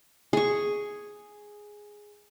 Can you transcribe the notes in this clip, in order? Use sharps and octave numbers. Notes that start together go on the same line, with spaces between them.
G#4 C#6